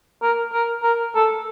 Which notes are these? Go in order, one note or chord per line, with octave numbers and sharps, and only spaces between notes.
A#4
A#4
A#4
A4